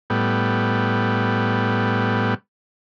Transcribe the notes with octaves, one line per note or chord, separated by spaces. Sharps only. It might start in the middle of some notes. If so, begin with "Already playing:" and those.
A2 G3 B3